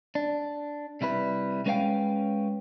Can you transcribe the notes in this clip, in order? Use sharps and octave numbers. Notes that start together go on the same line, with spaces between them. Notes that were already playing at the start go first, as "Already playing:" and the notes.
D4
C3 G3 E4 B4
G#3 C#4 B4 C#5 F5 G5